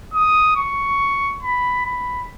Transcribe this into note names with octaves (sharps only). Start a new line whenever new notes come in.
D#6
C#6
B5
B5